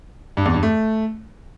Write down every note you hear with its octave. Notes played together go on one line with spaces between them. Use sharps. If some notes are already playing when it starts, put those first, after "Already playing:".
G2
E2
G2
A3